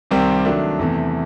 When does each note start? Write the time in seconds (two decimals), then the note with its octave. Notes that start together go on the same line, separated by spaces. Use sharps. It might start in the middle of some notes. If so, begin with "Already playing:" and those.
0.11 C2 C3 D#3 G3 C4
0.45 D#3 F#3 A3 D4
0.79 E2 C3 E3 A3